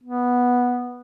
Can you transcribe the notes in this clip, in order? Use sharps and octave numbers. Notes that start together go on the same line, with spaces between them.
B3